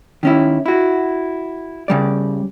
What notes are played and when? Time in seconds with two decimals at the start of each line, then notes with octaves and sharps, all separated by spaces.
0.23 D#3 C#4 E4
0.66 E4 F#4
1.88 C#3 G3 D5